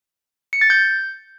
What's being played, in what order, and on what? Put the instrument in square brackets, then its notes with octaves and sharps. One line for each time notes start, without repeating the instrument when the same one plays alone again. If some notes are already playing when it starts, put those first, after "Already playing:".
[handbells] C#7
A6
G6